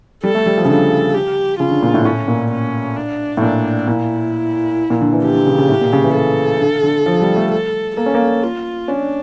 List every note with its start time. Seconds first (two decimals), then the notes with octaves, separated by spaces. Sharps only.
0.23 G3 A4
0.35 A3
0.46 G3
0.58 F3
0.65 C#3
0.69 D3 A4
1.14 G4
1.59 C#3 F4
1.71 D3
1.83 A#2
1.94 A2
2.05 A2 C#4
2.28 A#2
2.51 C#4
2.96 D4
3.37 A2
3.41 A#2 D4
3.88 A#2 E4
4.90 A#2
5.01 D3
5.13 E3
5.24 D3 G4
5.35 D3
5.47 C#3
5.58 C#3
5.69 A2
5.81 A#2
5.93 C#3
6.04 E3
6.16 A4
6.61 D3
6.83 D3
7.06 F3
7.21 G3
7.36 A3
7.52 A4
7.97 A#3 A4
8.06 C#4
8.14 A#3
8.43 F4
8.88 C#4 D4